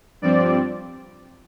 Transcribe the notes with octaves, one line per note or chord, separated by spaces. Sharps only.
G2 F3 C4 D5